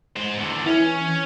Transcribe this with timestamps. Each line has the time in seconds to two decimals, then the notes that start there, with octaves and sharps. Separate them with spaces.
0.16 G#3 C5
0.37 E2 D3
0.66 E3 C#4